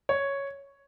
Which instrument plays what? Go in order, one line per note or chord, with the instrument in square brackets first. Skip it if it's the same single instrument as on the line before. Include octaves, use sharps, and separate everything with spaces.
[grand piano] C#5